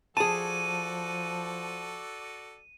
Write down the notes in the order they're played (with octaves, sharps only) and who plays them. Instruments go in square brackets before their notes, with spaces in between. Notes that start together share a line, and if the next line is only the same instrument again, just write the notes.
[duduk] F3 [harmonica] F#4 A4 D5 [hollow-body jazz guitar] G#4 A5 [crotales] D#7